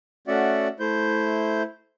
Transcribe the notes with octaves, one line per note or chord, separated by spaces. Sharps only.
A3 C#4 F#4 D5 E5 F#5
A3 E4 C5 G6